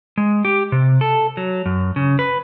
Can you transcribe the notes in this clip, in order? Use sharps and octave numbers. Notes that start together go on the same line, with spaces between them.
G#3
G4
C3
A4
F#3
F#2
C#3
B4